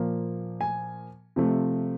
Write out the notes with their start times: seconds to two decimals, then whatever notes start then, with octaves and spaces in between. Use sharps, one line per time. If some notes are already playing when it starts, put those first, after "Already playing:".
Already playing: A#2 F3 A#3
0.61 G#5
1.36 C3 F3 A3